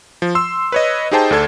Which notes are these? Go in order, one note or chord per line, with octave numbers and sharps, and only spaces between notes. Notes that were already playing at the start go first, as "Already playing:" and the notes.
F3
C6 E6
B4 C#5 D#5
D#4 G4 G#4 C5 G5 A5
D2 D3 D4 A4 A5 G#6